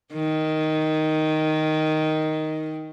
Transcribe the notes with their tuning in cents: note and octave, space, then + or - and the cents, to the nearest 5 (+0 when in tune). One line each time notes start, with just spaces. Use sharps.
D#3 +5